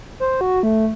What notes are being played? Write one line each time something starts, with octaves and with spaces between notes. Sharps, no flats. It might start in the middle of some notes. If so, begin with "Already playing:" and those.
C5
F#4
A3